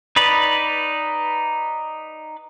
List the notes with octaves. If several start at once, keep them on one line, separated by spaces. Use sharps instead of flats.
D#4 B4 D5 B5